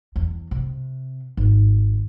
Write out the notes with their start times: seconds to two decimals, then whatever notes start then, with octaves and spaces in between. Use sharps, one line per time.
0.16 E2
0.51 C3
1.37 G#1